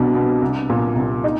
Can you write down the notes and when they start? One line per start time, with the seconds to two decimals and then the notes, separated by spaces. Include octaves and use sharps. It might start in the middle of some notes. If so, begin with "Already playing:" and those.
Already playing: C2 B2 D4
0.14 B2
0.42 C2
0.70 A#2
0.96 C2
1.24 D#4